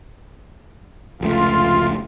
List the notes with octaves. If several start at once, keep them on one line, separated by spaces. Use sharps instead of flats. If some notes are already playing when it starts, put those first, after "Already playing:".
F1 C#2 A3 F4